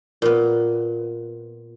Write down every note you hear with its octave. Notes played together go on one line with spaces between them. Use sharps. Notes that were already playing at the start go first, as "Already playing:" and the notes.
A#2 B3